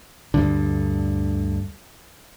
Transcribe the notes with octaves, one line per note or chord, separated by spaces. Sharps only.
D2 G2 D3